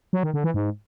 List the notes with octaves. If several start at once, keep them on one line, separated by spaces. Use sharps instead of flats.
F#3
D#3
D3
E3
G#2